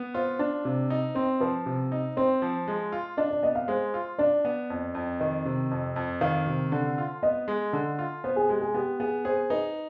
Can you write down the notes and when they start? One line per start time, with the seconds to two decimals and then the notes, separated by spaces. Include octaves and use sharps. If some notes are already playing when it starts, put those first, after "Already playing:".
Already playing: B3
0.14 F4 C5
0.39 D4
0.65 C3
0.90 D#4
1.15 C4 C5
1.40 F3 B4
1.66 C3
1.92 D#4
2.17 C4 C5
2.42 F3
2.68 G#3
2.92 F4
3.17 D4 D#5
3.31 D5
3.43 B3 D#5
3.55 F5
3.68 G#3 C5
3.94 F4
4.18 D4 D5
4.45 B3
4.70 F2
4.95 F2
5.20 D#3 D#5
5.45 C3
5.71 F2
5.96 F2
6.21 D#3 F5
6.47 C3
6.72 D3
6.98 F4
7.23 B3 D#5
7.48 G#3
7.73 D3
7.99 F4
8.24 B3 C5
8.36 G#4
8.49 G#3 G4
8.61 G#4
8.74 B3 G4
9.00 B3 G#4
9.25 G#4 C5
9.50 D#4 B4